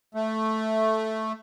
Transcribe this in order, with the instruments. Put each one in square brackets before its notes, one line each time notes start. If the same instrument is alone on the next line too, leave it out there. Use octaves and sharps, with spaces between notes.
[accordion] A3